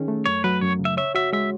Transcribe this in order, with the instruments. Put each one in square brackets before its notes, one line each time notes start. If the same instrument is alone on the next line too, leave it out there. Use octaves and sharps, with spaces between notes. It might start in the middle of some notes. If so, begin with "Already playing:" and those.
Already playing: [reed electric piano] D#3 C#4 G#4
A3
[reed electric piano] F#2 [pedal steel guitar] C#5
[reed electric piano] F#3 [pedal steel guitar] B4
[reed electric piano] F#2 [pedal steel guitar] C#5
[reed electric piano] C#3
[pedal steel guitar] E5
[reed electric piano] C#5 [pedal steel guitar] E5
[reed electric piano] F#4 [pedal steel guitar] E5
[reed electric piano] G#3 [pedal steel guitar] E5